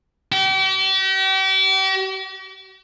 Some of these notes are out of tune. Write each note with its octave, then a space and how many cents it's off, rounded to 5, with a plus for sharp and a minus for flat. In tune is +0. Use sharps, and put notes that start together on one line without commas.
G4 -40